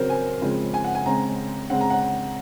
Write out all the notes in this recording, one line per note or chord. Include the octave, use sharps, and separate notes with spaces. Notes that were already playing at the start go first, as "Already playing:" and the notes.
Already playing: C#3 F#3 C4 A#4 C5
G#5
C#3 F3 G#3 C4
G#5
F#5
G#5
C#3 G#3 C4 A#5
C#3 G#3 C4 F#5
A#5
F#5